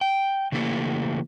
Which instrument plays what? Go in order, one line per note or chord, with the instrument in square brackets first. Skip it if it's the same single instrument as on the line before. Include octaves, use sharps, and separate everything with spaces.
[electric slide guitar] G5
C#3 E3 A3 A#3 G4